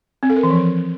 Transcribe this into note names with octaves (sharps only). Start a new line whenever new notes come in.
C4
A4
A#4
E3
F3